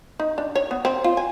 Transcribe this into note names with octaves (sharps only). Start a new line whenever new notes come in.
D#4
D4
C#5
B3
C4
F4
G#5